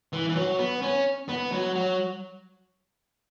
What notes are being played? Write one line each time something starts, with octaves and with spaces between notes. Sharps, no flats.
E3
E3
F#3
B3
C#4
B3
F#3
F#3